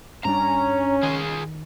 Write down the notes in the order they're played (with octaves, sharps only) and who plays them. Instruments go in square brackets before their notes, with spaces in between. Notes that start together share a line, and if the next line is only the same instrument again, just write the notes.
[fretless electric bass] G2 G3 D4 [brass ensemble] C#4 [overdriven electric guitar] A#5
[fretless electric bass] D#3 [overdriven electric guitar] F4 G#4